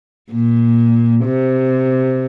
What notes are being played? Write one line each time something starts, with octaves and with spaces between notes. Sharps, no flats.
A#2
C3